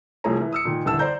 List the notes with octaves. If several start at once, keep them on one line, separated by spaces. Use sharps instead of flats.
C2 F3 A3 G#4 C#5 A#5
E3
D#6 E6 C#7
A#2 D#3
D#1 D3 E3 A5 E6 E7
C5 D5 A#5 G6